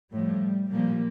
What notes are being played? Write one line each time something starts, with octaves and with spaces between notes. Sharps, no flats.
A2 F3 G3
A#2 F3 G3 A#3